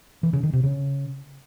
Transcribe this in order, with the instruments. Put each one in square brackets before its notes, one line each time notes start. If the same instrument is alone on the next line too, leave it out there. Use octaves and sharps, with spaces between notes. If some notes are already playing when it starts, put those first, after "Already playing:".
[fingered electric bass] E3
C#3
D#3
C3
C#3